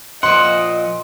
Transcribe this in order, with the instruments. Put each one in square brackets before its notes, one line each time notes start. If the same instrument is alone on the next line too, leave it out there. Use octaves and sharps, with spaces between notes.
[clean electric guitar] A#2 F3 F#5 [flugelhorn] D#5 [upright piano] C6